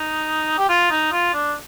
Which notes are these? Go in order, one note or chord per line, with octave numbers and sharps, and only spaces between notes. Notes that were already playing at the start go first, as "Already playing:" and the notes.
Already playing: D#4
G4
F4
D#4
F4
D4